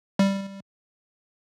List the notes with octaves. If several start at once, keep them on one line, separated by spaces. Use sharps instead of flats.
G3